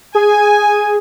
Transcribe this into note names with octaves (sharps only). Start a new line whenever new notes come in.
G#4 G#5